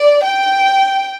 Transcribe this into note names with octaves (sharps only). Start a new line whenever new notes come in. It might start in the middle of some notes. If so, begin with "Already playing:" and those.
Already playing: D5
G5